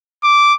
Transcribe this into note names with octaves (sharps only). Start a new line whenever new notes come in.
D6